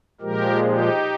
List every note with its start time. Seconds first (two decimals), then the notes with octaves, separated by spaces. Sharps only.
0.21 A#2 F3 G#3 G4 A#4
0.64 D#4 G4